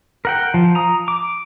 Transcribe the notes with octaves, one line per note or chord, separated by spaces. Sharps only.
A#4 F#5 G5
F3
A#5 D#6
D6